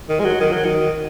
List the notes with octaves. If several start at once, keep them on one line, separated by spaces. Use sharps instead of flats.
D#3
G#3
F#3
D#3
F#3
D#3